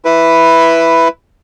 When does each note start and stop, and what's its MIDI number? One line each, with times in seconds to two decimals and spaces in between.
0.05 1.08 64
0.05 1.08 71